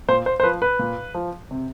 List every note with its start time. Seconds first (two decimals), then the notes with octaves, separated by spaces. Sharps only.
0.08 A#2 C5
0.26 C5
0.40 C5
0.43 F3 B4
0.62 B4
0.79 A#2
1.15 F3
1.51 C3